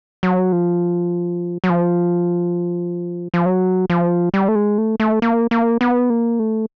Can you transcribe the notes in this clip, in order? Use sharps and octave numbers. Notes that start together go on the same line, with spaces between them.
F#3
F3
F#3
F3
F3
F#3
F3
G3
A3
G#3
A3
A3
A#3
A#3
B3
A#3
A3